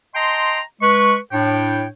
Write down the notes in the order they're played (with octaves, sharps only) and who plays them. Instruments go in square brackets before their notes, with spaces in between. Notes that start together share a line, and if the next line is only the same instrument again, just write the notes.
[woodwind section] D#5 G5 A5 A#5 C6
G#3 B4 C#6
A2 D4 C#5 G5